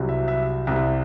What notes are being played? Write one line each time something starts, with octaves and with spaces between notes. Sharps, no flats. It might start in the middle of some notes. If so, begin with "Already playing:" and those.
Already playing: C2 C3 F#3
E5
E5
C2 C3 G3 E5